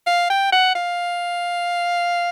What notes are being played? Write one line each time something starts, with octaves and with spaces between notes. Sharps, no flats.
F5
G5
F#5
F5